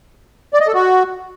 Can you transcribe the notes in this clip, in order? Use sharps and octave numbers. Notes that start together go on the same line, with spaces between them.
D5
D#5
A4
F#4